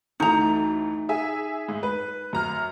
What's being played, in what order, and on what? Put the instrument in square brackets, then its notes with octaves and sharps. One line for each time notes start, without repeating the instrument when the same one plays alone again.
[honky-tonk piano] D2 E3 A3 [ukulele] D#4 A#5
[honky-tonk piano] G#4 E5 G#5
G#2
B4
F#2 A#5 F6